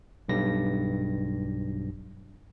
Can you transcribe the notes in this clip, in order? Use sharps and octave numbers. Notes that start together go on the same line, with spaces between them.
B1 G2 A#6